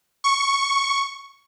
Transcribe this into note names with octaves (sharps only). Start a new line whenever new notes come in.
C#6